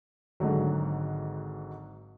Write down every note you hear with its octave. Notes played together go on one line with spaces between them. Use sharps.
G#1 G#2 D3 F#3